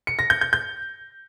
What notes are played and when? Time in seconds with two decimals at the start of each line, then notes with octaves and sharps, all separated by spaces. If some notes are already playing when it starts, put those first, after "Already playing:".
0.07 C#7
0.19 A#6
0.30 G6
0.41 G6
0.53 G6